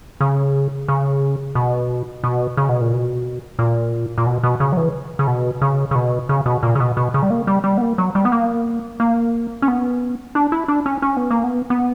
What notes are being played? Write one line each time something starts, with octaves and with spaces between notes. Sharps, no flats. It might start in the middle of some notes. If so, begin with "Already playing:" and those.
C#3
C#3
B2
B2
C#3
B2
A#2
B2
A#2
A#2
B2
B2
C#3
F#3
E3
C#3
B2
C#3
C#3
B2
C#3
B2
A#2
C#3
B2
B2
C#3
G3
A#3
G3
G3
B3
A#3
F#3
G3
B3
A#3
A#3
C#4
B3
D4
E4
D4
C#4
C#4
B3
A#3
B3
B3